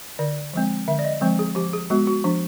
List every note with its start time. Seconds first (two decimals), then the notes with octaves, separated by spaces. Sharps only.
0.19 D3 D5
0.54 F3 G#3 C4
0.88 D3 E5
0.99 D5
1.04 D#5
1.21 F3 G#3 C4
1.39 G#4
1.55 F3 G4
1.73 G#4
1.90 G#3 B3 F#4
2.07 F#4
2.24 F3 D4